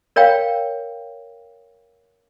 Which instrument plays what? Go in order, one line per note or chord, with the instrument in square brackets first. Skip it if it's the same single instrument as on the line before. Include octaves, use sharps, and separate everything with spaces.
[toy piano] A#4 C#5 F5 G5